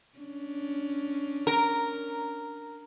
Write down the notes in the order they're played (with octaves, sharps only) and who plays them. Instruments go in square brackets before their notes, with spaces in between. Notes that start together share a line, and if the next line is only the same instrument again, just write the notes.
[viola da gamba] C#4 D4
[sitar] A#4